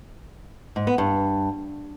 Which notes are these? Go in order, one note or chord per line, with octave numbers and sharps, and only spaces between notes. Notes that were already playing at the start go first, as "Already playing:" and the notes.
G#2
B3
G2